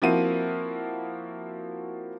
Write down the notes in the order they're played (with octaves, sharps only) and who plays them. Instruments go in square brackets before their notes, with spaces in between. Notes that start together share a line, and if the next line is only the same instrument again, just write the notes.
[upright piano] F3 A#3 C4 E4 F#4 D#7